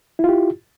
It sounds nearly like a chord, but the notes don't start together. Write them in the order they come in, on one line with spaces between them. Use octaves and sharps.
E4 F4 G4